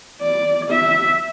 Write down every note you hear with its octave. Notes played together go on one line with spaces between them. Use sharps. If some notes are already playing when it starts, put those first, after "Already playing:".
D5
E5